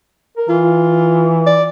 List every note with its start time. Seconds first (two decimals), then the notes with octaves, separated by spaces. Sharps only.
0.37 A#4
0.49 E3 F4
1.47 D5